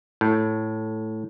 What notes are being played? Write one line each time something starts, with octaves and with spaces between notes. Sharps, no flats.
A2